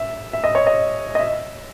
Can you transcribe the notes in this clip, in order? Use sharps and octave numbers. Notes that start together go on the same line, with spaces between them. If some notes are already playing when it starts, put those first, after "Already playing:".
Already playing: E5
E5
D#5
C#5
D#5
D#5
E5